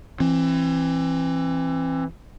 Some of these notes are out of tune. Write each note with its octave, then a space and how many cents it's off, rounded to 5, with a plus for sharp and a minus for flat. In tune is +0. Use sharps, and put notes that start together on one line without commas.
E3 +20 C4 +30